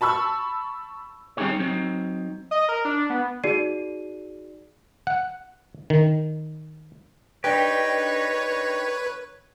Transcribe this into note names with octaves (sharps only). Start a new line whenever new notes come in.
A5 B5 C#6 E6
G3 C4 D#4 G4 G#4 C#5
F#3 C4 D#4
D#5
A#4
D4
B3
D#4 F#4 G#4 D5 C7 D#7
F#5
D#3
D4 D#4 G4 B4 C#5 G5